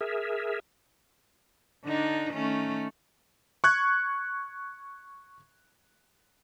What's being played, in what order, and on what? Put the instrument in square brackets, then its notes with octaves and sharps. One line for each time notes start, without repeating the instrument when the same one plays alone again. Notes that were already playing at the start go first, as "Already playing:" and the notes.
[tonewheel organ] G#4 A#4 E5
[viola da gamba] D3 D4 D#4
D#3 A3 C#4
[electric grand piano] C#6 F#6 G#6